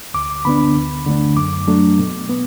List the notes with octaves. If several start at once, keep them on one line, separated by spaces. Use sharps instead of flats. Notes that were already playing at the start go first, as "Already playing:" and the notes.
D2 D6
D3 B3 D4 B5
D2
D3 A3 D4
F#2 D6
F#3 A3 D4
B2
B3